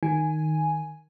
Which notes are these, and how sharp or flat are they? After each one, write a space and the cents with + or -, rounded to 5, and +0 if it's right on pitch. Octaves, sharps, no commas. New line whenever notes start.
D#3 +0 G#5 +0